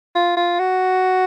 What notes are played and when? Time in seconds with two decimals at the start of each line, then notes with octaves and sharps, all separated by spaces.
0.15 F4
0.37 F4
0.59 F#4